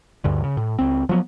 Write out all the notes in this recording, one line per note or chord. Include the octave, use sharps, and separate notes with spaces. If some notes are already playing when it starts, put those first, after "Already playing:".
D2 G2 D3
C#3
A2
C#2 C4
F3 F#3 B3